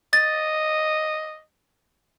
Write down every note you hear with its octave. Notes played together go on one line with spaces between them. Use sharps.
D#5 A6